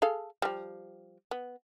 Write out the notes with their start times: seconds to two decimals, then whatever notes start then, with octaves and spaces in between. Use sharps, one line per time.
0.02 G#4 A4 F5
0.42 F3 G3
1.31 B3